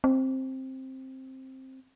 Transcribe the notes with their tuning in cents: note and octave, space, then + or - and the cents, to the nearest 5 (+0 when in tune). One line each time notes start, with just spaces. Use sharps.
C4 +10